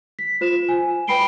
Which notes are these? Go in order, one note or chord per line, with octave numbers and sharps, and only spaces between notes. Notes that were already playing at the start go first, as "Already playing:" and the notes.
B6
F4 C5 E7
G#5
B4 G5 B5 C7 D7 G7